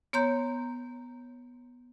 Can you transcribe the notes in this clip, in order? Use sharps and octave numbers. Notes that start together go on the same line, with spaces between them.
B3 C#5 A#5 C6 G6